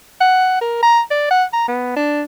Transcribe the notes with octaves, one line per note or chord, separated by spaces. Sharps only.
F#5
A#4
A#5
D5
F#5
A#5
B3
D4